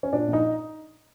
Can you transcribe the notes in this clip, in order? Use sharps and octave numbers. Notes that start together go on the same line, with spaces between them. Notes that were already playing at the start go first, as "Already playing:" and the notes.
C#4
A#2 D4
A#1
D#4